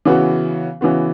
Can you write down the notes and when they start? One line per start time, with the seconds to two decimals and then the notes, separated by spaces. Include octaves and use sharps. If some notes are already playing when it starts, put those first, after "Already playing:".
0.05 C#3 E3 B3 F#4
0.81 C#3 E3 B3 F#4